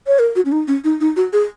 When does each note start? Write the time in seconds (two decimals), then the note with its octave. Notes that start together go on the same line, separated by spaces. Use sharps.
0.07 C#5
0.19 A#4
0.35 F#4
0.45 C#4
0.52 D#4
0.67 C#4
0.84 D#4
1.00 D#4
1.16 F#4
1.33 G#4